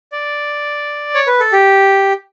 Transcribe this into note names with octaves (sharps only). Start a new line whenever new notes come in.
D5
C#5
B4
A4
G4